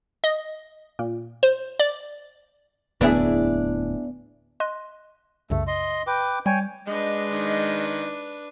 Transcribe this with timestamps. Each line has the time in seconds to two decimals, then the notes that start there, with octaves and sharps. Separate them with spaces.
0.24 D#5
0.99 A#2
1.43 C5
1.79 D5
3.01 D1 E2 B3 D4 E4 G#4
4.60 D#5 C6 F#6
5.50 C2 F#2 C#3 A3
5.67 D#5 C6
6.07 B4 G5 D6
6.46 G3 C#5 G5 G#5
6.87 G#3 D4 B4 D#5
7.31 D#3